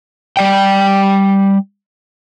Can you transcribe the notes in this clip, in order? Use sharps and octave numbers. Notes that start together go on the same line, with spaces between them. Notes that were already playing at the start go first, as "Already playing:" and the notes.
G3 D5 G5